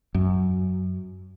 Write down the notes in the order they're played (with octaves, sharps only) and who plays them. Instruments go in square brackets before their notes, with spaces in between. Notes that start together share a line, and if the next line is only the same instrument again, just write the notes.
[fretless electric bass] F#2